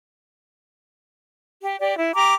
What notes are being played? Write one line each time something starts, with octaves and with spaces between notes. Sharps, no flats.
G4
G4 D5
E4
G4 A#5 D6